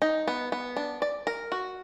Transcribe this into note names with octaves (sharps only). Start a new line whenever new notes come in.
D#4
B3
B3
D4
D5
A#4
F#4